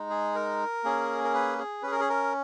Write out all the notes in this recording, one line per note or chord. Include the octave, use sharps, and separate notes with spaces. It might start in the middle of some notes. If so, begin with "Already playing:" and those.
Already playing: G#3 D#4
G#4
A#4
A#3 C#4 G#4
A#4
B4
G#4
C#4 G#4 B4
A#4
G#4
A#4